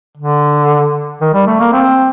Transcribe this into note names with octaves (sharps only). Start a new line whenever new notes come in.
D3
D#3
G3
A3
A#3
C4